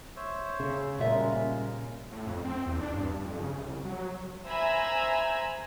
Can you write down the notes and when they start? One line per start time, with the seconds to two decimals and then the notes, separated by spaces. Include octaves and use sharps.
0.16 C5 C#5 E5
0.60 C#3
0.99 A#2 F3 G3 G#3 C#4 A#4 E5
2.11 A2
2.26 F2
2.44 C4
2.66 E2
2.81 D4
2.94 G2
3.24 F2
3.38 C#3
3.57 C2
3.84 F#3
4.46 C5 E5 G#5 A#5 B5 E6